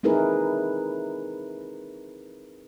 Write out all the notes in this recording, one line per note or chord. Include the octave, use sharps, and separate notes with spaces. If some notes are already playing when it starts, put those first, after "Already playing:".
C4 D#4 E4 G#4 A#4 B4